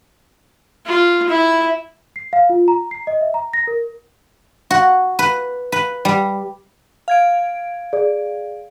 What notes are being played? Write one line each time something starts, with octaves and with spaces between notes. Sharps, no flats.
F4
E4 E5
C7
F5
F4
A#5
C7
D#5
E5
A#5
A#6
A#4
F#4
B4
B4
G3
F5 G#6 D7
G#4 D5